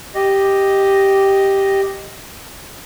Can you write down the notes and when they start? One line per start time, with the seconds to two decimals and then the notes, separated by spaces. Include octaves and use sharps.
0.15 G4 D#5